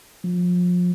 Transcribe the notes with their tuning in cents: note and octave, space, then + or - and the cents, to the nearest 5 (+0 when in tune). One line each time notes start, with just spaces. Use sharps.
F3 +30